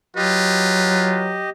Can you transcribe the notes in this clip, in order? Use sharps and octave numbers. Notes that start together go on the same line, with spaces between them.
F#3 F4 G4 B4 D#5